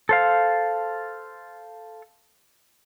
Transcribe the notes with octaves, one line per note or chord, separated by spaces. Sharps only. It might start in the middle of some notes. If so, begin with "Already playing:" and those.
A4 C5 F5